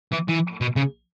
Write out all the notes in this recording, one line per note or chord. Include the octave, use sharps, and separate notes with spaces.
E3
E3
B2
C#3